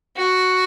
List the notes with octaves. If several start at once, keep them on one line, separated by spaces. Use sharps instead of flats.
F#4